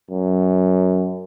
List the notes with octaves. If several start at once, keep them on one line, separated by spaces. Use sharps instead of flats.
F#2